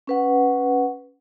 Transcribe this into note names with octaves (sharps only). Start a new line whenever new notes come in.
C#4 B4 F#5